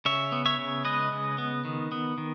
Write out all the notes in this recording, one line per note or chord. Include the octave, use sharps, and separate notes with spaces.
C#3 C#5 E5
B3
C#5 E5
C#3
G#3 B4 D#5
C#3
B3
D#3
B3
D#3